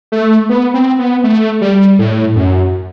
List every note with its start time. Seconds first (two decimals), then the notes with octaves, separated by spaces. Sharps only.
0.12 A3
0.49 B3
0.74 C4
0.99 B3
1.24 A3
1.61 G3
1.99 A2
2.36 F#2